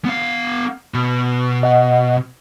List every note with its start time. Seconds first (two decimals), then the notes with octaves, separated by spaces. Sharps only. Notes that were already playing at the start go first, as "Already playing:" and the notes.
0.05 B3 F5
0.94 B2
1.63 D#5 F#5